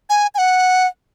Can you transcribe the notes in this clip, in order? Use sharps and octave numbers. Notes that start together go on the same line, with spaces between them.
G#5
G#5
F#5